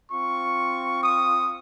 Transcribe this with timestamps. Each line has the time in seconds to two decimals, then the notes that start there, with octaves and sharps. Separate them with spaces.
0.10 C4 F4 C#6
1.03 D#6